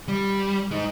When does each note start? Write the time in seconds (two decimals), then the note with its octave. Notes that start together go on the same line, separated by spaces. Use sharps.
0.08 G3
0.71 G#3 D#4